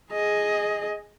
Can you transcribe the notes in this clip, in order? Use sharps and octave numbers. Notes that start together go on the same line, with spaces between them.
G#4 D#5